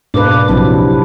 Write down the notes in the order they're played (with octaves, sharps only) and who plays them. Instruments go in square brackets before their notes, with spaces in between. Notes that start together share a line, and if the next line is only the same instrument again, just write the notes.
[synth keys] G#2 B2 A#3 [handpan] D4 B4 [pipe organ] D6
[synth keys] A#1 F2 F3 [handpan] C3 F#3 C4 [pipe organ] D4 E4